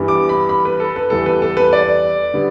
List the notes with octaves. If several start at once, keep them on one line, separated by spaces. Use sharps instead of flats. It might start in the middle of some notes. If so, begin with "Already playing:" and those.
Already playing: G2 E3 G3 B3
D6
B5
B5
B4
A4
B4
E2 E3 G3 A4
B4
A4
B4
D5
D3 G3 B3